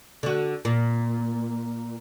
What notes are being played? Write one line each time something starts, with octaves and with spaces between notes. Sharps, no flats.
D3 F#4
A#2